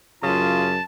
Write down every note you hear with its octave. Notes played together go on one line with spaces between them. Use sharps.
F#2 C#3 F4 A5